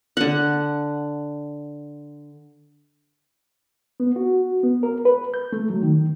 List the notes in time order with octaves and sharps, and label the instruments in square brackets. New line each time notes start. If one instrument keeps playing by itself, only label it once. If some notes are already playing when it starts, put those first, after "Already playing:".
[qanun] D3 F#5
[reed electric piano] B3
F#4
B3
A#4
B4
G6
A3
F#3
D#3